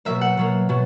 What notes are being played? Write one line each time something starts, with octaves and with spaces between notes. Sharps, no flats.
B2 F#3 A#3 E5
F#5
B2 F#3 A#3
B2 F#3